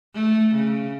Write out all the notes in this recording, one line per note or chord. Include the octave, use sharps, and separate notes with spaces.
A3
C#3